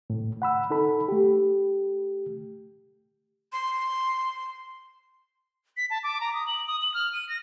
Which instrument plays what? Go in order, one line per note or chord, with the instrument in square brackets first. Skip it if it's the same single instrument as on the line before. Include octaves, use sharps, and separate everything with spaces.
[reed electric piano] A2
F#5 B5 E6
D#4 A4 B5
A3 G4
[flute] C6
[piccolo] B6
A5
D6
A#5
D#6
F#7
D#6
F#7
F6
D#7
A#6